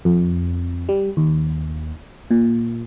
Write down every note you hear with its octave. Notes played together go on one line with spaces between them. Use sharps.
F2
G3
D#2
A#2